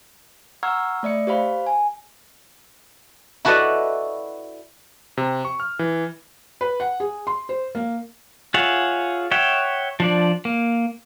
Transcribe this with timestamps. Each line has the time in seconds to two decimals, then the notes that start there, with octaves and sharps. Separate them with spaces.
0.63 F#5 A#5 C#6 E6 F6 G#6
1.03 A3 D5 E5 C#7
1.27 G4 C5 F5 B5
1.66 G#5
3.45 E4 F#4 A4 B4 D5 D#5
5.17 C3
5.45 C#6
5.60 F6
5.79 E3
6.61 B4
6.80 F#5
7.00 G#4
7.27 C6
7.49 C5
7.75 A#3
8.54 F4 G#4 C#5 E5 F#5
9.31 C#5 E5 F#5 G5
10.00 F3 D4 D5
10.45 A#3